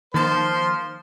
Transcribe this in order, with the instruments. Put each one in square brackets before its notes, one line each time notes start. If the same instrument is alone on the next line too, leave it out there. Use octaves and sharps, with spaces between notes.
[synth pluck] D#3 A#3 A5 [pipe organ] F3 [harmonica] C5